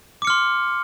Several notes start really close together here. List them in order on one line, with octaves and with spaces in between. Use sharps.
D6 C#7 F6 C6